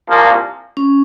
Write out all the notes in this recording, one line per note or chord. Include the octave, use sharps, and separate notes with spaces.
C2 A#2 F3 A#3
C#4